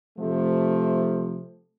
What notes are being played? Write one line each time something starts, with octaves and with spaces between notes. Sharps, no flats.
C3 F3 A3